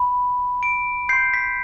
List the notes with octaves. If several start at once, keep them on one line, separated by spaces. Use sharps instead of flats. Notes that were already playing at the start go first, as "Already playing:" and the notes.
Already playing: B5
D7
C6 G6 C7
B6